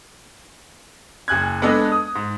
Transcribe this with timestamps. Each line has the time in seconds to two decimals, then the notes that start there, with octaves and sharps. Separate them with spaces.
1.28 F#1 G#5 F#6 G#6
1.62 G#3 B3 D4 A4 D#5
1.92 D#6
2.15 G#2